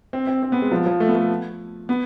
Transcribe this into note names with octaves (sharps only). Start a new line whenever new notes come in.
C4
C4
C4
B3
G#3
F3
F3
A3
B3
A3
B3